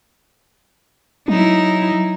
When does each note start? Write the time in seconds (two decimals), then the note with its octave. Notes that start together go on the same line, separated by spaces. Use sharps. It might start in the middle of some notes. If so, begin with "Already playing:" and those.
1.28 F#3 D#4 E4